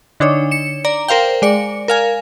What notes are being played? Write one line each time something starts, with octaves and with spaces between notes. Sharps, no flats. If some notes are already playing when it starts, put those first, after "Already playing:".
D3 D4 D#4 C#5
C#7 E7
D5 A#5
A#4 C5 F5 G5
G#3 D5 C#7
A#4 F5 G#5